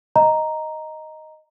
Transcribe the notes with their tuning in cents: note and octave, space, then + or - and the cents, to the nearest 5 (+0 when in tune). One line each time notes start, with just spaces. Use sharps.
D#5 +0 A#5 +0